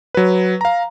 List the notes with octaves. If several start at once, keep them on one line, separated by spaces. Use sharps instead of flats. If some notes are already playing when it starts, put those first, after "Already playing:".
F#3 B4
F5 A#5